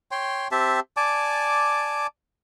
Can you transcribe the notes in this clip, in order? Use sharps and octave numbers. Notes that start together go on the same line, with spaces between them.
C#5 G5 C6
C4 G4 E5 A5
D5 G#5 A5 D6